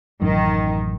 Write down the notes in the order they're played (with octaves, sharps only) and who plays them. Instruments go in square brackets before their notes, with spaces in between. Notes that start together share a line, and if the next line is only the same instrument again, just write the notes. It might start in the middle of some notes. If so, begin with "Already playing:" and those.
[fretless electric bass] A1 F#2 [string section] D#3